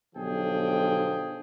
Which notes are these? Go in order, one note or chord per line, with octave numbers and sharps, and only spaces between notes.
B1 D3 F3 G4 G#4 G5